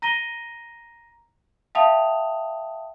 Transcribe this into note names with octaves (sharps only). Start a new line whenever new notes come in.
A#5 A#6 D#7 G7
E5 F5 G5 A5 D#6 F7